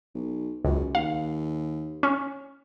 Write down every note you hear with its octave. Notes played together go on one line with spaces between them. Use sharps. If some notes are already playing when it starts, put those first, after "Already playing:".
B1
C#2 F#2
D#2 F5
C#4